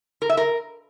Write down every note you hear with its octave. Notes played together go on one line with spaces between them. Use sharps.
A#4
E5
A#4